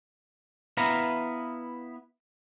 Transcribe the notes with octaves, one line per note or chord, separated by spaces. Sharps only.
B3 E4 B4 F5 A#5